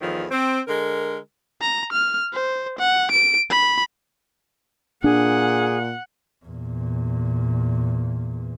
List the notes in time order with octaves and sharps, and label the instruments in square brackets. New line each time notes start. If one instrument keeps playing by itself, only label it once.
[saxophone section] E2 A2 D#3 F3
C4
D3 G#3 A#4
[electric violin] A#5
F6
C5
F#5
D7
B5
[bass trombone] A#2 [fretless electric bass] D4 [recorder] G#4 [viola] F#5
[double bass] E2 A#2